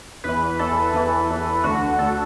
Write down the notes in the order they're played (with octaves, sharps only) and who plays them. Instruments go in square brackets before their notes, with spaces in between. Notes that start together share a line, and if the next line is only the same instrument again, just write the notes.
[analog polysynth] E2 E3 B4
E2 E3 A4
E2 E3
E2 E3
D2 D3 F#4
D2 D3 A4